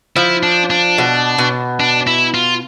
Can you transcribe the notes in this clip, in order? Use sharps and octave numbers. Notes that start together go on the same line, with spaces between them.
F3 E4
D4
D4
B2
B2
D4
E4
F4